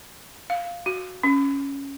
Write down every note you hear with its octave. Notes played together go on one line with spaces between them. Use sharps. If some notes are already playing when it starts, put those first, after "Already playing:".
F5
F#4
C#4